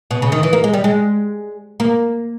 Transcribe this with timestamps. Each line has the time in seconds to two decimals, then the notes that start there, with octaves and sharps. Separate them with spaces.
0.11 B2
0.22 C#3
0.32 D#3
0.43 E3
0.53 A#3
0.64 G#3
0.73 G3
0.84 G#3
1.80 A#3